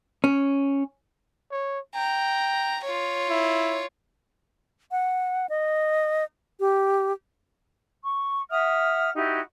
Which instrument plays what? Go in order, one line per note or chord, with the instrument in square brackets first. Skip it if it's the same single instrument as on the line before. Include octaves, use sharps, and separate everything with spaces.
[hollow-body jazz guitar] C#4
[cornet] C#5
[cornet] G5 [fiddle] A#5
[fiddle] F4 C#5
[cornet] E4
[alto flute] F#5
D#5
G4
[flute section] C#6
E5 F#5 D#6 F6
D#4 E4 F#4 G4